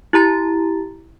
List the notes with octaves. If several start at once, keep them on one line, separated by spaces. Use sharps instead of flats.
E4 G4 A#5 A6